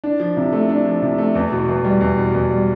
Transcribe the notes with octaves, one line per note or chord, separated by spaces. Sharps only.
D4
F3
C3
A3
D4
F3
C3
A3
E2
B2
E2
G3
E2
B2
E2
G3